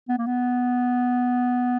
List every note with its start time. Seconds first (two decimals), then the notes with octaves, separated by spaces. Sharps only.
0.09 B3
0.18 A#3
0.27 B3